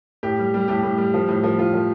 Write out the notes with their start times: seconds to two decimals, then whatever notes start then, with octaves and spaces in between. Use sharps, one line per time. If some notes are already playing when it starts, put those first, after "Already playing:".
0.23 A2 G4
0.39 G3
0.54 G3
0.68 A2 G4
0.83 A2
0.98 G3
1.14 F3
1.28 A2
1.43 F3
1.58 A2 F4
1.74 F3